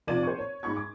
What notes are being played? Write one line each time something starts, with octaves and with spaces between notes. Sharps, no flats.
F1 C3 F4 D5 G#6 D#7
C5 C#6
C#5
G#2 D#4 B5 C#6 G#6
D6